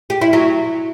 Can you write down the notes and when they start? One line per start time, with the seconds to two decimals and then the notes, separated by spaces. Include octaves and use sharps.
0.10 G4
0.21 E4
0.33 F#3